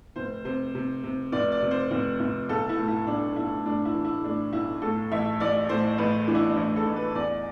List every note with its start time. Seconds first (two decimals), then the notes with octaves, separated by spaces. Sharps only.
0.16 F1 C5
0.45 C3 C5
0.75 C3
1.03 C3
1.32 F1 D5
1.52 D5
1.62 C3
1.71 C5
1.91 F1
2.20 F1
2.49 B1 A4
2.69 E4
2.78 A2
2.88 E4
3.07 B1 D4
3.36 B1 E4
3.65 A2 D4
3.85 E4
3.95 E3
4.05 E4
4.24 A2 D4
4.53 B1 E4
4.82 A2 A4
5.11 A1 E5
5.40 A1 D5
5.69 A2 C5
5.98 A1 B4
6.27 E3 D4
6.35 E4
6.43 D4
6.56 A1 E4
6.76 A4
6.86 A1
6.96 B4
7.15 E2 D5